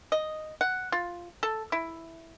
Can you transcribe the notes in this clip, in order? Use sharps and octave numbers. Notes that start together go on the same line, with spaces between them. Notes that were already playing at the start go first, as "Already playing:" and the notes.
D#5
F#5
F4
A4
E4